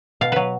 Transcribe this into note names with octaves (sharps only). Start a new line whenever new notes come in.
B2 F5
F#3 B4